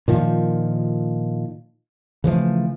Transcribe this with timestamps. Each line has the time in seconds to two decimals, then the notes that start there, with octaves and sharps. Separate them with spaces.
0.08 A#2 D#3 F3
2.24 C#3 E3 F3 A3